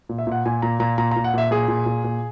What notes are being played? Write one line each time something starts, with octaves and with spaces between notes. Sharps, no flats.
A#2
E5
A#2 F#5
A#2 G#5
A#2 A#5
A#2 A#5
A#2 A#5
A#5
A#2
F#5
A#2 E5
A#2 G#4
A#2
A#2
A#2